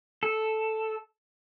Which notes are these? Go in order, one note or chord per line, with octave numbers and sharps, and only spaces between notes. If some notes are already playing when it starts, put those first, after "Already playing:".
A4